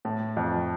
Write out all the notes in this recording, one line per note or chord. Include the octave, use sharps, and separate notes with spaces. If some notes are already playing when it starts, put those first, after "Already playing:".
A2
F2